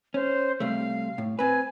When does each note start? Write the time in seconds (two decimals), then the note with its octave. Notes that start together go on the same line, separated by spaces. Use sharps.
0.14 C#4 C5
0.60 C3 G3 A3 F5
1.18 A2
1.39 C4 B4 G#5